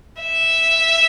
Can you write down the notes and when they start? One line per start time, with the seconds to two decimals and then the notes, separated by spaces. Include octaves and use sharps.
0.23 E5